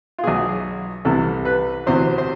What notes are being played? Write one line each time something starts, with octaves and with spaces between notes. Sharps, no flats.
F4
B1 B2 G#4
C2 C3 E3 A4
B4
D2 C3 E3 C5
C5